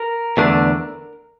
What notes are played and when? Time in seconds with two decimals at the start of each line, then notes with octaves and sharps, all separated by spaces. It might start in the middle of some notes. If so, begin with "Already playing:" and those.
Already playing: A#4
0.37 E2 D3 A3 D4